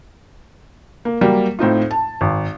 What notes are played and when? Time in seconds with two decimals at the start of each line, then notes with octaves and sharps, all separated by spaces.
1.05 A#3
1.21 F#3 G3 A#3
1.59 A2 C4 D#4 F4
1.91 A5
2.21 G#1